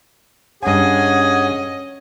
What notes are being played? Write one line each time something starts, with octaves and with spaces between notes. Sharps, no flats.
G2 C#4 G#4 D#5 F#5 G#5